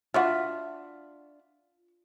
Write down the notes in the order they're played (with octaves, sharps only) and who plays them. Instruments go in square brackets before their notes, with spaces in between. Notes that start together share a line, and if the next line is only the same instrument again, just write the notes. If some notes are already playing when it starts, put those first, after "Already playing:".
[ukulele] D4 E5 [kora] F4 [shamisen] F#4 B4 F#5